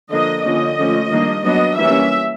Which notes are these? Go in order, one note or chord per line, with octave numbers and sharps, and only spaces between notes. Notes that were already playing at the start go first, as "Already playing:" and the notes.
D3 F3 A#3 D#5
D3 F3 A#3 C#4 D#5
D3 F3 A3 C#4
D#3 G3 A#3 D4
F#3 B3 D4 D#5
E3 G3 A#3 C#4 E5